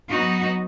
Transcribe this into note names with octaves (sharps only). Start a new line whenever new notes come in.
F#3 B3 D#4 F#4